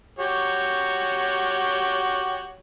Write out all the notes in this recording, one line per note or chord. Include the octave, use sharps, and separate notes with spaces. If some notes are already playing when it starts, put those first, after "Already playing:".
F#4 G4 C#5